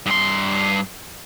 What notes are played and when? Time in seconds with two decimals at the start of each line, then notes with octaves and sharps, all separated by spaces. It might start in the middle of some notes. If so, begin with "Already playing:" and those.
0.06 G2 C6